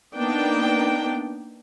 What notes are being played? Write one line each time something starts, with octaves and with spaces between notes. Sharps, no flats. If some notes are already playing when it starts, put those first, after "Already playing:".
A#3 B3 D4 D#4 G5